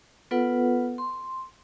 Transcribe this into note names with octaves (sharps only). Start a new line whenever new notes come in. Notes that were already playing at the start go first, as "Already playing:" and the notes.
B3 F4 A4 B4 F#5
C6